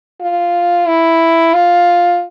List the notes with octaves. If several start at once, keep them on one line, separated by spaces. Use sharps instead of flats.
F4
E4
F4